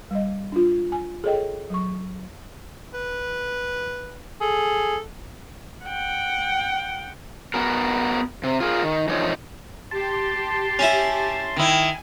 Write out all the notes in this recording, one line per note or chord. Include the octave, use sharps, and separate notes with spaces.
G3 D#5
D4 F4
G#5
G#4 A4 C#5 D#5 G5
F#3 C#6
B4
G#4 A4
F#5 G5
B3 F#4 A#4
C3
F4 G#4 A#4
D#3
D3 E3 F3 D#4 C#5
G4 A5 C6
C#4 E4
D#3 E4 G#5